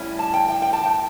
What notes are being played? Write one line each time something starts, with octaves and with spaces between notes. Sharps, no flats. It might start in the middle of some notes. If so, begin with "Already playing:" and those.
Already playing: A2 G3 C#4 E4
A5
G5
G5
G5
A5
G5